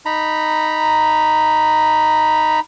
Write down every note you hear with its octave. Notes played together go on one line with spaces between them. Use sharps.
D#4 A#5 B5